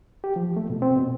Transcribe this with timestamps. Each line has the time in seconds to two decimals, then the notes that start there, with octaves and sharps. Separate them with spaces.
0.24 G4
0.36 F3
0.57 A3
0.70 B2
0.82 C4
0.97 B2